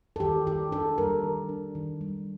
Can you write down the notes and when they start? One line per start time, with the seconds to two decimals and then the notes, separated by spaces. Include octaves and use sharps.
0.16 A4
0.20 D#3 G4
0.47 D#3 G4
0.72 D4 A4
0.98 G3 A#4
1.23 D#3
1.49 D4
1.75 D#3
2.01 G3